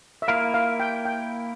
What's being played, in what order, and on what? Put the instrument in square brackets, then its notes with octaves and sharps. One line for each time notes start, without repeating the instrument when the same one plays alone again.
[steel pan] E5
[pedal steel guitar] A#3 E4 A#4 [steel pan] F5
[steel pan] F5
G5
G5